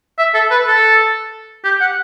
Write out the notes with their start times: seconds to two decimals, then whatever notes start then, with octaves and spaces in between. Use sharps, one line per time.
0.18 E5
0.34 A4
0.51 B4
0.67 A4
1.64 G4
1.81 F#5